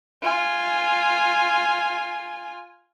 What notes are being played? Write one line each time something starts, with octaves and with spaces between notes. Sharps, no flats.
F4 G#5